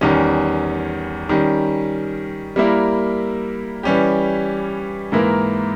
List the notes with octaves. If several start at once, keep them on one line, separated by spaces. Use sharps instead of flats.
E2 D#3 G3 C#4
D#3 G3 C#4
G3 A#3 E4 A#4
E3 G3 C#4 G4
G#2 E3 A#3 E4 A#4